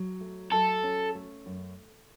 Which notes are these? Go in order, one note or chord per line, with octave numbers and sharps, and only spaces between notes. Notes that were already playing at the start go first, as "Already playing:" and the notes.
Already playing: F#3
A3
F#3 A4
C#4
A3
F#2